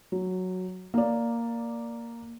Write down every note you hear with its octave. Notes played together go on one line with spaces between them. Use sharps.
F#3
A#3 D5